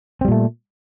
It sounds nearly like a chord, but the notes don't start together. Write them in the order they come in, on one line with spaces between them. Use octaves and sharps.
C4 G3 A#2 A3